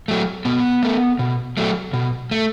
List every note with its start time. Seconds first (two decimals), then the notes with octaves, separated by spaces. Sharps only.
0.08 F#3 A3
0.45 B2 B3
0.83 A3
1.19 B2
1.57 F#3 A3
1.93 B2
2.31 A3